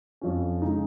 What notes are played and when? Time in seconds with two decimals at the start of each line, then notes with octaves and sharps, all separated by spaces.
0.21 F2 F3 C#4
0.62 C#3 G#3 D#4